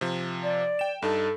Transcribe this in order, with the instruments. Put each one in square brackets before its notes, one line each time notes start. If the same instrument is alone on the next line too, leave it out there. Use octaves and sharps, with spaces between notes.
[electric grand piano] C3 F3
[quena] D5
[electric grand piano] G5 E7
[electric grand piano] G2 D#4 A5 [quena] A4